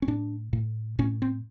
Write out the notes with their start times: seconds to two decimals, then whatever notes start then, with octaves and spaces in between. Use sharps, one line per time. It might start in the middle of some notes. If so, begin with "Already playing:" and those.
0.02 C#4
0.08 A2 D4
0.53 A2
0.99 A2 C#4
1.22 C4